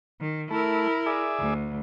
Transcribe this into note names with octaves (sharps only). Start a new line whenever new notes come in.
D#3
A3 E4 A#4
G#4 D5 E5
D2